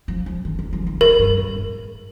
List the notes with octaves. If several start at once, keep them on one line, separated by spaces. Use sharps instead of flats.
F3
F3
D#3
D#3
F3
D#3
C#3 A#4
G2
G2
G#2